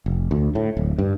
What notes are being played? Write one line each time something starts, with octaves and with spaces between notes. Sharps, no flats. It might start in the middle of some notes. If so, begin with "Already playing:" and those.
F1
D2
A2
D1
G2